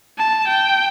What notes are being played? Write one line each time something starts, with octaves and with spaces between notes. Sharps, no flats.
A5
G5